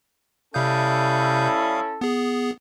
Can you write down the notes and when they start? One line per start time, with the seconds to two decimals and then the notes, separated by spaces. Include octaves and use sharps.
0.54 C3 G3 C#4 E4 A4 F5 D#6 G6
2.01 B3 G#4